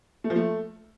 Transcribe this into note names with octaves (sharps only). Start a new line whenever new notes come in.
A3
F3
A3